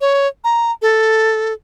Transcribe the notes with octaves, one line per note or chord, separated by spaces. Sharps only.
C#5
A#5
A4